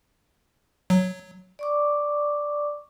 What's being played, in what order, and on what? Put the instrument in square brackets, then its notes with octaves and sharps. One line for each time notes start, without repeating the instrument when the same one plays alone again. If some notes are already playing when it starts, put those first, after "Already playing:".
[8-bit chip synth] F#3
[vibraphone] D5 C#6 D6